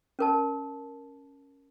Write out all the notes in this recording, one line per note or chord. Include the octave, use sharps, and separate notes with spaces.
C#4 A#4 A5